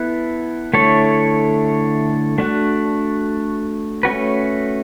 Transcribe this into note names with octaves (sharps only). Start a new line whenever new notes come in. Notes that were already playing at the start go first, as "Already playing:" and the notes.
Already playing: B3 E4 A4
D3 A3 E4 A4 C#5
A3 D4 F#4
A3 C#4 F#4 B4